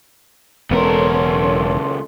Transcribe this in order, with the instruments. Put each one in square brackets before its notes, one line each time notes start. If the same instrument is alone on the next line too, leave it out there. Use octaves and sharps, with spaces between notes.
[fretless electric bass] E1 B3 [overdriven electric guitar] C#2 A#4 [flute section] C#4 A4 C6